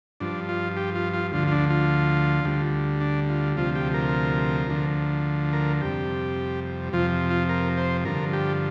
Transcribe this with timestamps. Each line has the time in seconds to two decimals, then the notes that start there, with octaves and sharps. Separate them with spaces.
0.20 G2 F3 D4
0.49 F4
0.77 G4
0.95 F4
1.14 F4
1.32 D2 D3 F3 F4
1.48 F4
1.52 D4
1.70 F4
2.45 D2 D3 G3
3.01 D4
3.29 F4
3.57 D2 C3 F3 F4
3.75 G4
3.94 A#4
4.69 D2 D3 F3
5.53 A#4
5.81 F2 C3 G3 G4
6.93 F2 C3 F3 F4
7.30 F4
7.49 A#4
7.77 C5
8.05 G2 D3 F3 A#4
8.33 G4